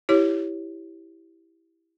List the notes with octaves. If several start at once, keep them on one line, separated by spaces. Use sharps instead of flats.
E4 G4 C#5